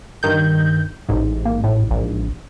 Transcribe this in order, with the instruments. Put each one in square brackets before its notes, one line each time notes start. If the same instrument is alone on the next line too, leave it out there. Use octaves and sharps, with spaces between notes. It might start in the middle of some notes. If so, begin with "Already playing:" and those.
[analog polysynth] G2 D#3 G6
A1 G#2
[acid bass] A#3
A2
A#1